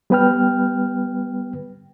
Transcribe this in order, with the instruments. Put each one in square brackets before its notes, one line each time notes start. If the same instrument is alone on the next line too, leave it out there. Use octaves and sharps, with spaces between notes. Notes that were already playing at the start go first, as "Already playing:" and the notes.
[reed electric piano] G3 B3 B4 G5 F6